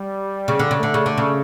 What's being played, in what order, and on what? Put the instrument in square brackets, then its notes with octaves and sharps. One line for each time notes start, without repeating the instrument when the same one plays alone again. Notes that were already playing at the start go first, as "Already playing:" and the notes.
Already playing: [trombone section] G3
[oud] C#3
D3
C#3
[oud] D3 [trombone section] A3
[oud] C#3
D3
C#3